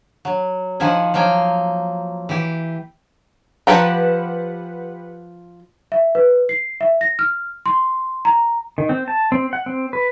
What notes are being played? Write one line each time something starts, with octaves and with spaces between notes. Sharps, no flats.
F#3
D#3 F3 F#5 G#5
F3 F#3 A#3 G5 G#5
E3 G4
F3 G4 B4 F#5 G5 A#5
E5
B4
C7
E5
A#6
F6
C6
A#5
D#3
C4
A5
C4
F#5
C4
B4